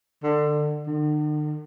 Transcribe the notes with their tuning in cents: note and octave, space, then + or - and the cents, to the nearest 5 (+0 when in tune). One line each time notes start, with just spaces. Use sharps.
D3 +25
D3 +45